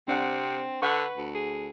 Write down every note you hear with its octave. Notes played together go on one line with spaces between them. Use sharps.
C3 C4 D4 F#5
D3 B4 F#5 C#6
D2
G#4